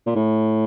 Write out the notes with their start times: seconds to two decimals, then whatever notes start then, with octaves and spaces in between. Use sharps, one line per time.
0.07 A#2
0.15 A2